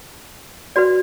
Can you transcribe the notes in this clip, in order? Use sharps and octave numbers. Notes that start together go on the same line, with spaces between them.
F#4 B4 D5